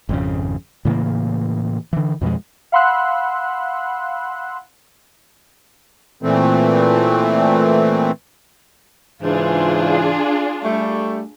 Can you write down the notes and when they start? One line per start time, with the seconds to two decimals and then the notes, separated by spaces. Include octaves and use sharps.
0.09 G#1 F2 C#3
0.85 A2 C#3 E3 A#3
1.93 D3 E3
2.21 F2 B2 F3 G#3
2.72 F5 F#5 B5 C6 E6 F#6
6.23 A#2 E3 A3 C4
9.23 G#2 C#3 E3 D4 F4 G#4
10.64 G3 A3